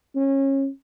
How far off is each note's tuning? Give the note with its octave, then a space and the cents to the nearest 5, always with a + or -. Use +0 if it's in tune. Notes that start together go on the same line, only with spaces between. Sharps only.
C#4 -25